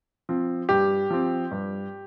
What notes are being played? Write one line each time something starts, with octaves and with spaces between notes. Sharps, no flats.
F3 C4
G2 G4
F3 C4
G2